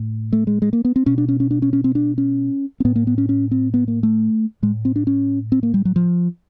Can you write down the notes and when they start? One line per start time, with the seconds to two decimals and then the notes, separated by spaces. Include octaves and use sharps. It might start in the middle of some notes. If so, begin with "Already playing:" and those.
Already playing: A2
0.33 A3
0.47 G#3
0.62 G#3
0.73 A#3
0.85 B3
0.96 C4
1.06 B2 C#4
1.18 D4
1.28 C#4
1.40 C#4
1.51 D4
1.62 C#4
1.73 C#4
1.84 C4
1.95 D4
2.18 C#4
2.80 C4
2.85 A2 B3
2.96 A#3
3.07 B3
3.18 C#4
3.29 C#4
3.51 C4
3.74 B3
3.88 A#3
4.03 A3
4.62 A2 G#3
4.85 C4
4.96 D4
5.07 C#4
5.52 C4
5.63 A#3
5.74 G3
5.85 F#3
5.96 F3